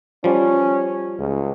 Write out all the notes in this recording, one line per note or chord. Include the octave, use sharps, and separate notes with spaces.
F3 G3 C#4
C#2